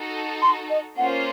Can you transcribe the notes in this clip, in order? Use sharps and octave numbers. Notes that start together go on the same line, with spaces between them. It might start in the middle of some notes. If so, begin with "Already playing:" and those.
Already playing: D#4 F#4 A4
C6
D#5
A#3 C#4 F4 C5 F#5